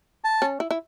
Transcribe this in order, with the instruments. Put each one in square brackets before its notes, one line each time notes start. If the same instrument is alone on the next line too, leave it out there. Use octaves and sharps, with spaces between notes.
[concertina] A5
[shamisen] C#4
E4
E4